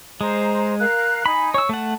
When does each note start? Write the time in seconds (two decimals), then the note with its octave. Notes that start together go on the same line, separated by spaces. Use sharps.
0.21 G#3 C5 A#5
0.79 A#4 F5 F#6
1.26 D#4 G#5 B5
1.54 C#5 E6
1.69 A3 F#5 A5